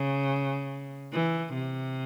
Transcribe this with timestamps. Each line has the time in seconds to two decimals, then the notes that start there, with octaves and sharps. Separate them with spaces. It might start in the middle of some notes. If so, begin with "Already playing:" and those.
Already playing: C#3
1.13 E3
1.54 C3